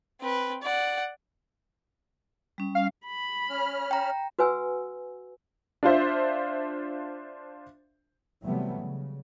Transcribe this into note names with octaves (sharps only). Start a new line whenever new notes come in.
C4 B4
D5 F#5
G3 C#4
F5
B5
C#4 F6
G5 A#5
F#4 B4 F#5 G#5 E6
D4 F4 C5 E5
C3 E3 F#3 G3 A3 B3
C#3